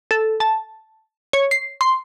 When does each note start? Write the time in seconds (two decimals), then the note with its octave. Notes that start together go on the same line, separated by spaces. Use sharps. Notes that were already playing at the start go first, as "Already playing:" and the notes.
0.11 A4
0.40 A5
1.33 C#5
1.51 C7
1.81 C6